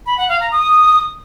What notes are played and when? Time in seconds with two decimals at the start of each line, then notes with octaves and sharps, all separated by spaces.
0.06 B5
0.18 F#5
0.29 F5
0.40 A#5
0.52 D#6